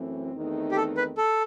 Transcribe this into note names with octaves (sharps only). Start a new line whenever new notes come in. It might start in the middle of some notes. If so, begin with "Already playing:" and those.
Already playing: F#2 E3 A3 C4
E2 D#3 A3 C4 D#4
G4
A4
B4
A4